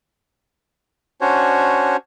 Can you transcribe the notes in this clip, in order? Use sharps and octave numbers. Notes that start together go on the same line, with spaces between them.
C#4 D4 F#4 C5 C#5